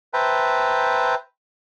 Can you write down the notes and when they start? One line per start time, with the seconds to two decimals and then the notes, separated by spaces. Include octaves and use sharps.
0.14 B4 C5 E5 G5 A5 A#5